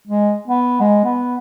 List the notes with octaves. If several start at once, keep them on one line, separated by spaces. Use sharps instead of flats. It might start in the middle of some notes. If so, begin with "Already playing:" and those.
G#3
B3
G#3
B3